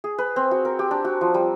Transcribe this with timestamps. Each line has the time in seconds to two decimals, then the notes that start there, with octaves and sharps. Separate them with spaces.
0.04 G#4
0.18 B4
0.36 C4
0.51 F#4
0.65 A#4
0.79 G4
0.91 D4
1.05 F#4
1.21 F3
1.34 G3